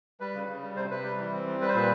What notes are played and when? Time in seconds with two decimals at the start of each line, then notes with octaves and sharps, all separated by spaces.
0.20 G3 B4
0.34 C#3
0.48 C#3
0.62 G3
0.76 C3 C5
0.90 C3 B4
1.04 G3
1.18 E3
1.32 C4
1.46 G3
1.61 G3 B4
1.68 C5
1.75 A#2 B4